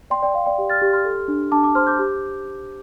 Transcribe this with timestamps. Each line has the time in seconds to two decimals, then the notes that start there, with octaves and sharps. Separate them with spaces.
0.10 D5 G5 C6
0.22 D5 G5
0.34 D5 F5
0.46 D5 G5
0.58 G4
0.70 F6 A6
0.82 G4
0.93 C6 F6
1.05 A4
1.28 D4
1.52 D4 A5 D6
1.63 A5 D6
1.75 C5 C6 F6
1.87 D6 G6
1.99 G4